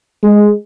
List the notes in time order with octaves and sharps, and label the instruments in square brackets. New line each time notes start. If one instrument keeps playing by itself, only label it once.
[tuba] G#3